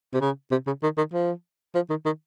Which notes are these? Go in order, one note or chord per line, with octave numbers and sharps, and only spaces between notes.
C3
C#3
C3
C#3
D#3
D#3
F3
F3
D#3
D#3